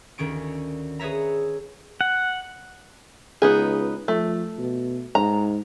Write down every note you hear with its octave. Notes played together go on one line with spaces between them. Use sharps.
D2 D#3 C#4 C#6 D7
G#4 B4 C#5 E5 A#5
F#5
C#2 B3 D#4 G#4
F3 A3
B2
G#2 A#5